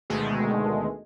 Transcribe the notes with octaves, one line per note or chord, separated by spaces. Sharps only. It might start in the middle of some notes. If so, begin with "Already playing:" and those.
D2 B2 D#3 G#3 A3